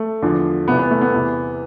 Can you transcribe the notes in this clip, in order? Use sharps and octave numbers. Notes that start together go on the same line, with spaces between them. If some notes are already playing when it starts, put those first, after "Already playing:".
Already playing: A3
E2 D3 F3
C2 C3 E3 B3
B3
A3
B3
E2 C3 E3